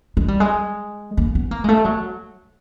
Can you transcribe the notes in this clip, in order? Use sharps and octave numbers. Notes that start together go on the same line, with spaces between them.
G#3
G3
G#3
A#3
B3
A#3
G#3
A3
F#3